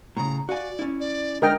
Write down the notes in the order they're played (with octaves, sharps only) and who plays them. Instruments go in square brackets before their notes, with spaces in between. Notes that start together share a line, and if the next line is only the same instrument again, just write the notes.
[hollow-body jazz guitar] A2 C#3 [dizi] A#5
[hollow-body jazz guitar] F#4 F5 G#5 [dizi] D5
[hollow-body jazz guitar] C#4 E4
[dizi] D5
[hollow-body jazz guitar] D3 G#3 D4 [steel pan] A#4 D#5 G5 [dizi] F6